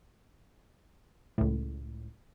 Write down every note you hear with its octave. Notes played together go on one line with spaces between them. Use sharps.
C#2 A2